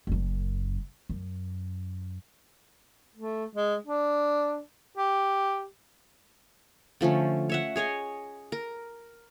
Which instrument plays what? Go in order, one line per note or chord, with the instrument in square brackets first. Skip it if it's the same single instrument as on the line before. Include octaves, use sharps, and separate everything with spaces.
[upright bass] F#1 F#2
F#2
[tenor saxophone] A3
G#3
D4
G4
[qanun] D3 F3 A3 C#4
C#5 E5 F#5
G#4 C#5 D#5 G#5
A#4